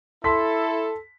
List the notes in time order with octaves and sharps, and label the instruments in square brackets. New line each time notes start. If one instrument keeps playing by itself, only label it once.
[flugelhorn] E4 [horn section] A4 [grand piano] A5 C6 B6